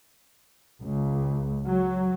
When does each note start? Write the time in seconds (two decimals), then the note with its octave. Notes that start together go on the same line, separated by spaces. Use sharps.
0.82 C#2
1.66 F#3